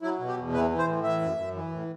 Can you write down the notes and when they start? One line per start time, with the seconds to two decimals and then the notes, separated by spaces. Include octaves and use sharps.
0.02 F#3 E4
0.19 B2
0.28 G4
0.37 E2
0.53 E3 B4
0.71 E3
0.78 C5
0.87 A2
1.04 E3 E5
1.21 F#2
1.37 F#2
1.54 E3
1.72 A2